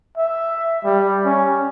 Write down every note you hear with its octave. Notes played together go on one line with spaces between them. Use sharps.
E5
G3
C#4